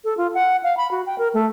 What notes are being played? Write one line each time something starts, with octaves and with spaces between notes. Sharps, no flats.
A4
F4
F#5
F5
B5
F#4
G5
A#4
A3